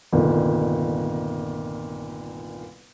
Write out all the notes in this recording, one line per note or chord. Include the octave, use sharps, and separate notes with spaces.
G1 C2 A#2 D#3